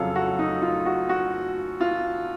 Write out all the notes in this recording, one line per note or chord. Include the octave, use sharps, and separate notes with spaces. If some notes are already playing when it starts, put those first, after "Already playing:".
Already playing: F2 C#3 F#3 A4 F5
F#4
D#4
F4
F#4
F#4
F4